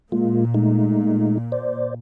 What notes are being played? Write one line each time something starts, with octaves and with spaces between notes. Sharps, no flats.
A#2 G#3 A#3 F4
G#3 A3 D#4
C5 D5